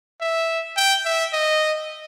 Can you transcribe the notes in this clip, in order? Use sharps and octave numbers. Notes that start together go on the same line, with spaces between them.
E5
G5
E5
D#5